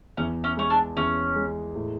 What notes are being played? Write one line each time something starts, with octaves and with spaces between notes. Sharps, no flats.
E2 C#4
C#4
G#3 C#4
D4
E2 C#4
G#3
A2